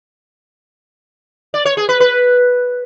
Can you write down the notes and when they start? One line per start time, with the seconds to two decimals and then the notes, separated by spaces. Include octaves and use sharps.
1.54 D5
1.65 C#5
1.77 G#4
1.89 B4
2.00 B4